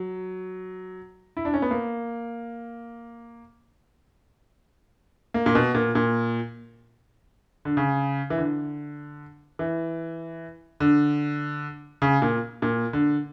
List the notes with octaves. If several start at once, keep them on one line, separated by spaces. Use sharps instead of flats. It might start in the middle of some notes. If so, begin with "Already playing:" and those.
Already playing: F#3
E4
D4
C#4
B3
A#3
A#3
A#2
B2
A#2
A#2
D3
C#3
E3
D3
E3
D3
C#3
A#2
A#2
D3